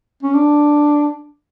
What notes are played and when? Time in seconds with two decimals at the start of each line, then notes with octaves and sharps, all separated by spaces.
0.23 C#4
0.35 D4